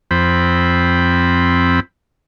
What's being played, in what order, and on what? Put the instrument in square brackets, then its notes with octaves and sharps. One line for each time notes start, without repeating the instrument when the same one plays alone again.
[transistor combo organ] F2 C4 B5